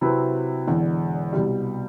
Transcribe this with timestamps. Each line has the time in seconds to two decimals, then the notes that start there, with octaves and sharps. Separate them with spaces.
0.01 C3 F#3 C4 E4 B4
0.67 E1 E2 D3
1.33 C2 B2 G3